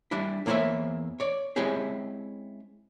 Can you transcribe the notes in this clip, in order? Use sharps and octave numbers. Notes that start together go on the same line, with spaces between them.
G3 D4 E4
E2 A#3 E4 C5 C#5 E5
C#5 D5
G#3 C4 C#4 E4 G4 G#4